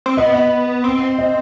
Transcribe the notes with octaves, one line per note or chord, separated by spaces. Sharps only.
C4
B3 D#5
D#5
C4
D#5